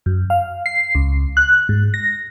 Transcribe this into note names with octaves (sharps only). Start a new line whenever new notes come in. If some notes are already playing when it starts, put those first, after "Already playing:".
F#2
F5
C7
C#2
F#6
G#2
A#6